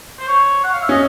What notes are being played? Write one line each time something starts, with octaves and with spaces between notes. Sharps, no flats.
C5
C#5
F#5
F5
E5
C#4 D#5